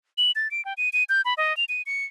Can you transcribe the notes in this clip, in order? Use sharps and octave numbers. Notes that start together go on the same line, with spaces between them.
F#7
A6
D7
G5
D#7
D#7
G6
B5
D#5
F7
D#7
C#7